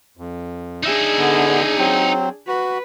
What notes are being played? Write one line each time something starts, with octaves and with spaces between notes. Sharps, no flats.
F2
D4 D#4 G#4 E5
D3 B3
F#3 C4
F#4 B4